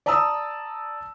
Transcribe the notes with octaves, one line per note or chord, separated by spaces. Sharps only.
D5 A5 A#5 D#6 E6